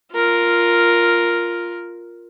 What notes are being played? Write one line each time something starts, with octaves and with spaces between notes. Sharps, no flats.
F4 A#4